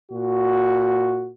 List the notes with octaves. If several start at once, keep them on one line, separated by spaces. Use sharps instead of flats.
A#2 F#4